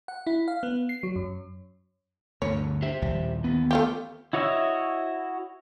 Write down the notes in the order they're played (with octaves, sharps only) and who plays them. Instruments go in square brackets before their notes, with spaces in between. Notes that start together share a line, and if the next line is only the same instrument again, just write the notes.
[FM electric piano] F#5
E4
F5
B3
C7
F#3
F#2
[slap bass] D2 G2 D3 [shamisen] C#5
[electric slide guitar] G4 C5 E5
[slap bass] A#1 D#2 G3
[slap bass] D#2 E3 [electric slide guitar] B3
[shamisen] A3 F4 G4
[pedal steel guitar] E4 F#4 C#5 D#5 E5